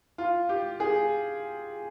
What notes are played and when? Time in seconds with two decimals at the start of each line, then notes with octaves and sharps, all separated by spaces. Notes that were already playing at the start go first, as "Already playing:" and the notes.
0.18 F4
0.49 G4
0.80 G#4